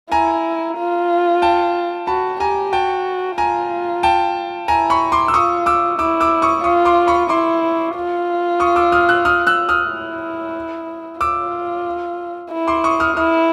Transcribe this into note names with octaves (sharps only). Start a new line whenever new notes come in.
E4 G#5 A#5
F4
G5 A5
F#4 A5 B5
G4 G#5 A#5
F#4 G5 A5
F4 G#5 A#5
G5 A5
E4 G#5 A#5
B5 C#6
C6 D6
E6
F4 C#6 D#6
D6 E6
E4 D6 E6
D6 E6
C#6 D#6
F4 C#6 D#6
C6 D6
B5 C#6
E4 C6 D6
F4
C#6 D#6
D6 E6
D#6 F6
E6 F#6
D#6 F6
E6 F#6
D#6 F6
E4
F4 D6 E6
E4
C6 D6
C#6 D#6
D#6 F6
E4 D#6 F6